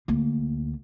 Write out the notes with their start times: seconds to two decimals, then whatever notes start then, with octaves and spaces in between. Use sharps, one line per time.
0.08 D2 A#3